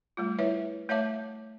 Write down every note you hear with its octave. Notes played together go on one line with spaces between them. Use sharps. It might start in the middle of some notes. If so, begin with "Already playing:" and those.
G3 A3 F4
E4 B4 C#5 E5
A3 C#5 E5 F5 A5 D6